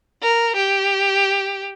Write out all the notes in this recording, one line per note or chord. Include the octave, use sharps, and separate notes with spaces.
A#4
G4